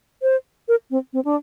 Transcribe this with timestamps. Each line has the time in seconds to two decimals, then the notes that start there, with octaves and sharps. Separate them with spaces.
0.22 C5
0.68 A#4
0.91 C4
1.13 C4
1.25 D4